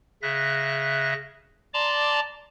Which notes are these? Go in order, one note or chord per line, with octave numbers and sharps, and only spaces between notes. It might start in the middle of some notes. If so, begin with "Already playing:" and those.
C#3 E5 F#6 A#6
D5 A5 A#5 C6 D6